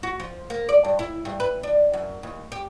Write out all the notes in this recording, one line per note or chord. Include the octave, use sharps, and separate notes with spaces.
F#4
F3
A#3
D5
G2
E4
G2
B4
D4
F#2
D#2
G4